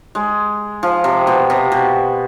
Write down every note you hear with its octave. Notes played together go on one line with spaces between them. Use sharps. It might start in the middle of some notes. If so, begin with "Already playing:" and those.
G#3
F3
C3
B2
C3
B2